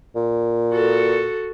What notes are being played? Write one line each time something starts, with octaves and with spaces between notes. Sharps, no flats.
A#2
F#4 A4